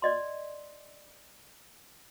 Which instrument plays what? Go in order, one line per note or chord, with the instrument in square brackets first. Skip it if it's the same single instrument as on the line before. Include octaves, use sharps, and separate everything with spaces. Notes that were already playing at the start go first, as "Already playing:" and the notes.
[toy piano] D5 D#5 C6